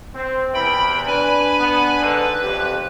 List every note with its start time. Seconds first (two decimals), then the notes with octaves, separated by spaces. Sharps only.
0.15 C4
0.54 E2 C3 E3 G5 B5
1.07 D4 B4 G#5 B5
1.59 B3
2.02 G#2 D3 B4
2.43 B1 F2 G4